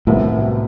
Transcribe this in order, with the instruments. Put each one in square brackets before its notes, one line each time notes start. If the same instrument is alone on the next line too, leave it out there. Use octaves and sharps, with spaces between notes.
[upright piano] C2 C3 D#3 F#3 B3 [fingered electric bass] A2